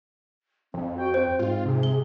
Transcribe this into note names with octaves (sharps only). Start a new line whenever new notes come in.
F2 C4
F#4 G5
C4 C5
G#2 F4
C3 G#4
G7